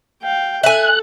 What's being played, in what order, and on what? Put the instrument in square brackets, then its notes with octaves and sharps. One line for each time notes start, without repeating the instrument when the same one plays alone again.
[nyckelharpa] F5 G5
[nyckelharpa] A4 [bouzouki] E5 G#5 [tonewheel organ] F#6